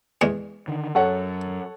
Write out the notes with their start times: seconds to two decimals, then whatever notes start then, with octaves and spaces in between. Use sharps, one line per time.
0.21 E2 G#3
0.68 D3 D#3
0.95 F#2 A4 C#5 F#5